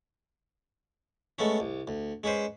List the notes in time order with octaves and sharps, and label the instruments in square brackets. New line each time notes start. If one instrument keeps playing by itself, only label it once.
[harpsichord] G#3 A3 B3 C#4
C2
D2
G#3 C#4 B4 C5